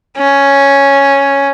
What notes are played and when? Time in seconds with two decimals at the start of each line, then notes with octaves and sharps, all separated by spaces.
0.17 C#4